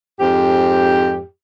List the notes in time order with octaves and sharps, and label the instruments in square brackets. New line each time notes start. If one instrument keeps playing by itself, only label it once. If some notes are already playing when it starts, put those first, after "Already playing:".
[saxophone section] F2 G#2 G4